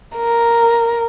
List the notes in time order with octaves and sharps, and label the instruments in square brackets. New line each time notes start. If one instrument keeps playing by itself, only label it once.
[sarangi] A#4